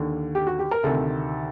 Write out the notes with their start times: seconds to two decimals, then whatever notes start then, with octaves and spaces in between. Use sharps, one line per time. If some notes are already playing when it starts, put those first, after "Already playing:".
Already playing: D#2 D3
0.35 G4
0.47 F#4
0.59 G4
0.71 A#4
0.83 D2 C3 D#3 A4